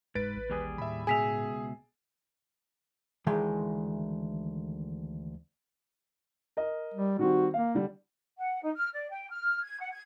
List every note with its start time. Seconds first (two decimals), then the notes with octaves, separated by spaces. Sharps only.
0.15 F1 G#2 B4 A6 D7
0.36 A1
0.50 D#2 G3 G#4
0.78 A2 E5 B5
1.07 C#2 B2 G#4 E5 G#5 B6 F7
3.27 D2 D#3 E3 G#3 G5 C6
6.57 A#4 D#5
6.94 G3
7.19 D#3 G3 C4 F#4
7.54 A#3 F5
7.74 D3 G3
8.37 F#5
8.62 D#4
8.75 F6
8.93 D5
9.09 G5
9.30 F6
9.62 G#6
9.80 F#5
9.92 G#6